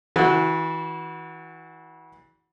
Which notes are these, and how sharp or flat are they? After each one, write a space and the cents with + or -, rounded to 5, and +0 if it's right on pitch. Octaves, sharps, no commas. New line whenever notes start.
E3 -30 F#4 +0